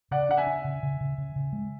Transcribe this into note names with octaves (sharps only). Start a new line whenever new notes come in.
C#3 D5 F#5
D4 F#5
E5 G#5
D4
C#3
C#3
C#3
C#3
C#3
G#3